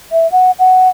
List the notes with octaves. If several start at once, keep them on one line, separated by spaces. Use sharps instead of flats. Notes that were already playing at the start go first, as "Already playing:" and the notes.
E5
F#5
F#5